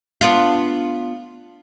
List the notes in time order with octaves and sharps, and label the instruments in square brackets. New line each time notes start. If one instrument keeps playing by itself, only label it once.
[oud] B3 D4 F4